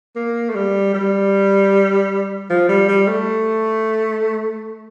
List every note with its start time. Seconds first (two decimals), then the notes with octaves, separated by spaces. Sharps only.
0.16 A#3
0.50 A3
0.55 G3
0.94 G3
2.50 F3
2.69 G3
2.88 G3
3.08 A3